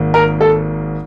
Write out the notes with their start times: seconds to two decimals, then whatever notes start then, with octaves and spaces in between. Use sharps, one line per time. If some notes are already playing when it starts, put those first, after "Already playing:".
Already playing: G#1 G#2 A#3
0.14 A#4
0.41 A4